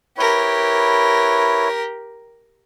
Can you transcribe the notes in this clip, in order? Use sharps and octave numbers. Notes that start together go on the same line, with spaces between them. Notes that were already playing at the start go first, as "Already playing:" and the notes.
E4 G4 A#4 B4 C#5